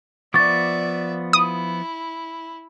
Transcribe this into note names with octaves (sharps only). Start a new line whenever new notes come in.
F3 B3 D5 E5 C#6 D6 A6
E4 D#6